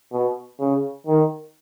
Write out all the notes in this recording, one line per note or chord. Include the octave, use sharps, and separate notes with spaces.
B2
C#3
D#3